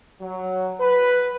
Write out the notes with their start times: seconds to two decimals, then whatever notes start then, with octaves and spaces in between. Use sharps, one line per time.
0.21 F#3
0.80 B4